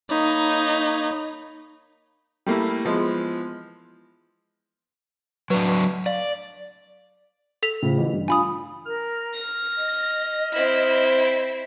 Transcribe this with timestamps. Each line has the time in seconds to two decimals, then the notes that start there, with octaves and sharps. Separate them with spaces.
0.10 A#3 D#4 C#5 B5
2.46 G3 A3 A#3 E4
2.85 E3 F3 G#3 B3
5.50 F#3 D4 B4 G5
6.06 D5 F5
7.63 A4 B6 F7
7.82 A2 C#3 F3
7.98 A1 E3
8.13 G2
8.28 D4 F4 G#5 B5 D#6
8.86 A#4 F6
9.33 A#6
9.77 D#5
10.53 C4 E4